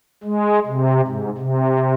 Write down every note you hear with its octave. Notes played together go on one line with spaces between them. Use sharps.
G#3
C3
G#2
C3